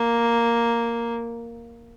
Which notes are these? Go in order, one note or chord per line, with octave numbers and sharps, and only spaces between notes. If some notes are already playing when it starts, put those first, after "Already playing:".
Already playing: A#3